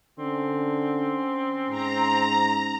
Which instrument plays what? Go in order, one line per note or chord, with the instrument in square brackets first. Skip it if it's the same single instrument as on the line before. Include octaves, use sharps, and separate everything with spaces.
[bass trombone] D3 [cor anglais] C4 [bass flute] C#4
[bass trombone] G#2 [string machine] A#5